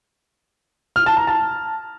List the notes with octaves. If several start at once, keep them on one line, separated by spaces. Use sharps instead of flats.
F6
A5
A#5
A5